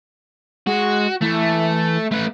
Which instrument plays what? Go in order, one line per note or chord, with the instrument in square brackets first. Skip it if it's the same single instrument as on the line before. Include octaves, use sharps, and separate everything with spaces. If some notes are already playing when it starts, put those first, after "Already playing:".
[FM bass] G#3 [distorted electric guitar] F#4
[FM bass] E3 [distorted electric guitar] A3
[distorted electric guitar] A3 B4